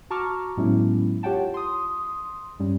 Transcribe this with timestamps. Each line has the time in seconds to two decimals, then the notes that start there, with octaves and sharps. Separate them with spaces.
0.10 F#4 A5 A#5 C#6 D6 F6
0.57 A2 F#3 G#3 B3 C#4 E4
1.23 F4 G4 C#5 F#5 G5 A5
1.54 C6 D#6
2.59 G2 G3 C#4